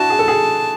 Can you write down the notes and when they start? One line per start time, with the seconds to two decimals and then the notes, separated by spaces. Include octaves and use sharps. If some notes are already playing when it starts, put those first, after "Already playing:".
Already playing: D4 E4 F#4 A5
0.10 G#4
0.19 A4
0.28 G#4